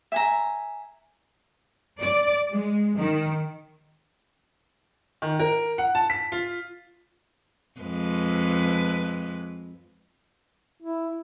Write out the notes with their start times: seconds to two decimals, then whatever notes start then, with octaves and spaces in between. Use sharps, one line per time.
0.12 E5 G#5 A#5
1.99 D5
2.50 G#3
2.97 D#3
5.22 D#3
5.40 A#4
5.78 F#5
5.95 A5
6.10 B6
6.32 F4
7.80 F2 G#3 B4
10.83 E4